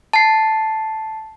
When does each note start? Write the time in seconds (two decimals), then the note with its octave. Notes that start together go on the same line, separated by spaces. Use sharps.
0.13 A5 C7